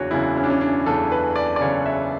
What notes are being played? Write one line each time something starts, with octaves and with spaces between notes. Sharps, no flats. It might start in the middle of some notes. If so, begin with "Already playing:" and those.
Already playing: F#1 E2 C#3 D4 F#4 C#5
F#1 E2 C#3 E4
C#4
D4
C#4
D4
F#1 E2 C#3 A4
B4
D5
D5
F#1 E2 C#3 C#5
E5